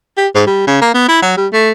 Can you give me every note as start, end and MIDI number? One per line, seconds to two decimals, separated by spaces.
0.17 0.28 67
0.34 0.43 44
0.47 0.65 55
0.67 0.81 49
0.82 0.89 58
0.94 1.03 59
1.08 1.20 64
1.22 1.34 54
1.37 1.47 55
1.53 1.71 57